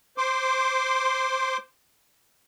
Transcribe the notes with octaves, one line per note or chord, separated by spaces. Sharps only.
C5 C6 D6